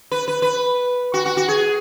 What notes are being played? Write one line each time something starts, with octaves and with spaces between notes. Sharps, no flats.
B4
B4
B4
F#4
F#4
F#4
G#4